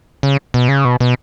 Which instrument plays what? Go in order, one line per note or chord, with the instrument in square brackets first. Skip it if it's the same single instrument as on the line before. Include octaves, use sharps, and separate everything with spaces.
[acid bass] C#3
B2
C#3
B2
B2